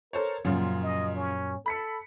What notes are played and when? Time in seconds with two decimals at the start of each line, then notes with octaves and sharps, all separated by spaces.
0.13 A4 A#4 C5 C#5
0.45 F#2 A#2 C#3 F3 F4
0.83 D#5
1.16 C#4
1.66 A4 B5 B6 C#7